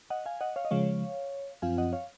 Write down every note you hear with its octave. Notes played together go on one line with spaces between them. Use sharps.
D#5 F#5
F5 G#5
D#5 F#5
C#5 F5
D#5
C#3 F3 G#3 C#5 F5
F#2 F3 C4 F4 F5 G#5
D#5 F#5
C#5 F5